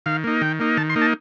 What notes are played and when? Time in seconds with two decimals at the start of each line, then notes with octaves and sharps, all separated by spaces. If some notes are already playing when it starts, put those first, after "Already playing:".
0.06 D#3 F5
0.24 A#3 D#4
0.41 D#3 G5
0.60 A#3 D#4
0.77 D#3 A5
0.90 C6
0.96 A#3 D#4
1.01 A5